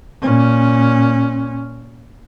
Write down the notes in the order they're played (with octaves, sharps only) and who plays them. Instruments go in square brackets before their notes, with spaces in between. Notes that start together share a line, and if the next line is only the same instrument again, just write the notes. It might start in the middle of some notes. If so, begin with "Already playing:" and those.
[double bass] A#2 C#4